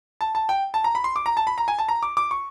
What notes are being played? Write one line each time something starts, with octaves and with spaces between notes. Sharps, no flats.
A5
A5
G5
A5
A#5
B5
C6
D6
A#5
A5
B5
A#5
G#5
A5
A#5
D6
D6
C#6